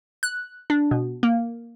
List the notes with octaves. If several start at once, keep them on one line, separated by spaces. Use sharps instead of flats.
F#6
D4
B2
A#3